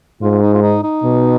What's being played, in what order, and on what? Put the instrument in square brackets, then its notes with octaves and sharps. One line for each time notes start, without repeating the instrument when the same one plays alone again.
[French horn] G#2 [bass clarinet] F4
[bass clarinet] D#4
F4
D#4
D#4
[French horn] B2